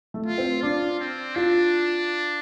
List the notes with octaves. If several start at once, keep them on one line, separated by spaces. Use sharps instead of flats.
A3
F4
C4
D4 F4
C4
D4 F4